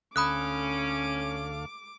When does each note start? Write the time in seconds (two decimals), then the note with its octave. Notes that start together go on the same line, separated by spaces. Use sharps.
0.16 D2 C#4 A4 F5 B5 D6 D#6 F#6